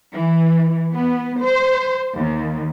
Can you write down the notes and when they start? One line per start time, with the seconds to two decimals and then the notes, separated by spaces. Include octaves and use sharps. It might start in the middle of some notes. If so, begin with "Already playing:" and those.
0.13 E3
0.93 B3
1.42 C5
2.16 D#2